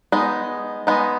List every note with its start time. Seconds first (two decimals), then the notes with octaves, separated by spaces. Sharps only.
0.12 G#3 B3 D#4
0.87 G#3 B3 D#4